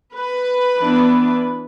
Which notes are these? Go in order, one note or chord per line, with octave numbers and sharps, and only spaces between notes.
B4
E3 B3 D4